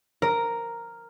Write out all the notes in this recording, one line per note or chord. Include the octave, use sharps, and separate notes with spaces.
A#4